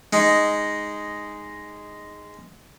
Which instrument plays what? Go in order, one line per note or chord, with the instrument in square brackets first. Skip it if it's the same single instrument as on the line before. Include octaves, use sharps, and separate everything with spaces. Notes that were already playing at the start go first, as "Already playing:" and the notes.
[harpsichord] G#3 D#4